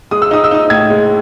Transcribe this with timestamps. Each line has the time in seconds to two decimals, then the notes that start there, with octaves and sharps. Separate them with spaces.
0.11 G#3 D#6
0.22 E6
0.31 D#4 D#6
0.44 E6
0.51 D#4 D#6
0.70 A2 G#6
0.90 G#3